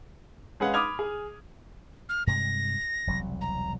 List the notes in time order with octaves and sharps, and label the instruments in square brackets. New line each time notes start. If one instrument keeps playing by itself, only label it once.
[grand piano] G#3 C#4 G#4 B4 F5 F#5
B5 D6 D#6 F6 G#6 F7
G#4
[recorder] F6
[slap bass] G2 C3 G#3 [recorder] A#6
[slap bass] E1 C2 F#3
[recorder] A#5